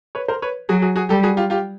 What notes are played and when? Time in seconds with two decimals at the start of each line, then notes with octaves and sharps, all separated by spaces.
0.15 B4 C#5
0.28 A#4 C5
0.42 B4 C#5
0.69 F#3 F#4 G#4
0.82 F#4 G#4
0.96 F#4 G#4
1.09 G3 G4 A4
1.23 F#4 G#4
1.37 F4 G4
1.50 F4 G4